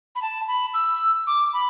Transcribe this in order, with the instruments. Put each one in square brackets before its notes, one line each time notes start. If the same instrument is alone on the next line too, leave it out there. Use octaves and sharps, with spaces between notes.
[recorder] B5
A5
B5
E6
D6
B5